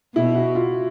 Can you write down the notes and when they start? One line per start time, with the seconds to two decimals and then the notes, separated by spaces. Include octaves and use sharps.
0.15 B2 E4
0.35 F#4
0.55 F4